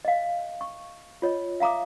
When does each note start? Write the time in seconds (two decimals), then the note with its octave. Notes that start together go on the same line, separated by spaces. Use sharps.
0.05 D#5 F5
0.61 C#6
1.22 F4 C#5 D#5
1.60 E5 F5 A#5 D6 D#6